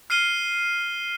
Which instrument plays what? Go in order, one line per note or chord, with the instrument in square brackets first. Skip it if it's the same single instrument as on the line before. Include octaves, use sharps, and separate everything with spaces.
[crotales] F6 C7 D#7 G7